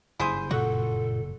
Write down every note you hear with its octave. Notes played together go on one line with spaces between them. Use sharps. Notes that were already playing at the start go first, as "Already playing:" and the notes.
F#1 G2 E4 G#4 C5
A#2 F#4 A4